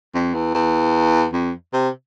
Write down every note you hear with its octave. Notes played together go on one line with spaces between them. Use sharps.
F2
E2
E2
F2
C3